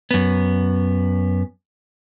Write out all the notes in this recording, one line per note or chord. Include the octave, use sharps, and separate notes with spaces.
F#2 B3